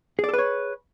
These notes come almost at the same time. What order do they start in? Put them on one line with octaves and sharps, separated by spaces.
G#4 D5 A4 B4 C#5